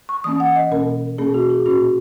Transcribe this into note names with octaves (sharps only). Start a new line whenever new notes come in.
C#6
E3 A#3 C#4 D#6
F#5
D#5
B2 A#3 C#4 A#4
B2 A#3 C#4 G#4
F#4
G#4
A#2 A#3 C#4 F#4